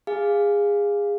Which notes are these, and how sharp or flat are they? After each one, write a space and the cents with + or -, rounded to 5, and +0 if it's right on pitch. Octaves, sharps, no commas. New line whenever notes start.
G#4 -20 F5 +0 G#5 +0